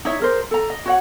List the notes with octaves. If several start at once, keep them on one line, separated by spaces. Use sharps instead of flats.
D#4 E4 C#5 E5
G#4 A#4 C5
A4 A#5
D#5
F#4 C#5 F#5